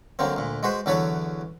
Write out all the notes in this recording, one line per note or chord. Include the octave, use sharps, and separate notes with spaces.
D3 F#3 A#3 C4
D2 A#2
G#3 F#4 B4 C5
E2 D3 F#3 A4 B4 C#5